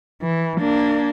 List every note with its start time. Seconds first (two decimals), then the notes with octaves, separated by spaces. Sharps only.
0.22 E3
0.60 A#3 D4